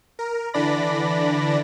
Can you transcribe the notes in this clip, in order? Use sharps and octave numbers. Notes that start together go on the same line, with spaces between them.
A#4
D3 E3 D4 D5 B5 A#6